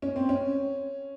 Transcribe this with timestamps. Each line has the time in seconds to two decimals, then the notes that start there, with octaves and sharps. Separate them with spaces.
0.02 C#4
0.16 C4
0.29 C#4